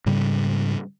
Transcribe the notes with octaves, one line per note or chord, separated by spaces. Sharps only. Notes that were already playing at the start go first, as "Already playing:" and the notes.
G#2 C#3 G3